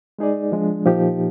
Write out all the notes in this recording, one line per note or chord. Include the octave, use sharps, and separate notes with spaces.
G#3 D#4 G#4 D5
F3 G#3 D4
A#2 F3 A#3 D#4 G4